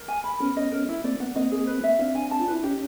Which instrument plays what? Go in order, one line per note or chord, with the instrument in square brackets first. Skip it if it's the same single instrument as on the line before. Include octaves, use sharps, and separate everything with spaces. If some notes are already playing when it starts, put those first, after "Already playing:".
Already playing: [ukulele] A#4
G#5
B5
[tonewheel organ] B3 C#4 [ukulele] A#4
[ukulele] D#5
A#4
E4
[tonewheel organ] A#3 C4 [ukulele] D5
[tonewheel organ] B3 [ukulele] F#5
[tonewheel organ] A#3 C4 [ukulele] D#5
[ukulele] G#4
B4
E5
[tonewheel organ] C4 D4 [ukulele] F5
[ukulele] G#5
A5
[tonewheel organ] F4
[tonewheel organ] E4 [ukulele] B4
[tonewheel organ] C#4 D#4 [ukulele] G4